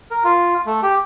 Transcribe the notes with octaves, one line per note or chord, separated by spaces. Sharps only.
A#4
F4
A3
G4